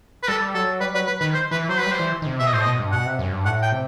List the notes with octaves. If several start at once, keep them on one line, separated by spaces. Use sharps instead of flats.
B4
G3 A4
F#3 A4
G3 B4
F#3 B4
B4
D#3 B4
C5
E3 B4
F#3 C5
B4
G3 C5
E3
D#3
C3
B2 E5
D#5
A2 C5
B2 D#5
G2
B2 F#5
C3
F#2
G2
A2 F#5
G5
C3